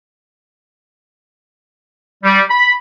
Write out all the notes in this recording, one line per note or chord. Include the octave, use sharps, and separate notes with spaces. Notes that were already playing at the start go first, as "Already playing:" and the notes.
G3
B5